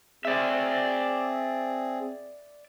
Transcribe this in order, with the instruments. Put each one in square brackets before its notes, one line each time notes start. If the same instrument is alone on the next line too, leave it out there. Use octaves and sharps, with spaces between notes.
[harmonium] C4 G#4 [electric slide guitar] D5 E5